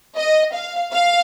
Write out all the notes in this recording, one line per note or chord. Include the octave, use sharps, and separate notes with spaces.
D#5
F5
F5